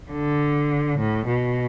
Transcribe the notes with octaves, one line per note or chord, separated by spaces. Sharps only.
D3
A2
B2